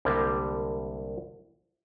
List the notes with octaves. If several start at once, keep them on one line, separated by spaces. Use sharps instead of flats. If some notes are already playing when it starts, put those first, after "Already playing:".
C2 D3 G3 G#3 A#3